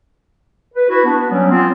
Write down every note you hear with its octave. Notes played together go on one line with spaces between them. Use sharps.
B4
E4 F#4
B3 D4
F#3 G3 B3 C#4
B3 C4 F4